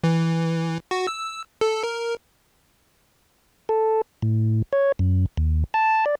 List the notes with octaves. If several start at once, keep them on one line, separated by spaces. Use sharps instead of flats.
E3
F#4
E6
A4
A#4
A4
A2
C#5
F#2
D#2
A5
D5